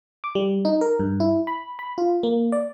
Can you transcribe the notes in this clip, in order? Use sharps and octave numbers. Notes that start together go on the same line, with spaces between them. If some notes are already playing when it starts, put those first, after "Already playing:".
D6
G3
D#4
A#4
G2
E4
B5
B5
F4
A#3
D5